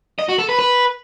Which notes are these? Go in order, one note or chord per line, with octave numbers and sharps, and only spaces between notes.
D#5
F#4
A4
B4
B4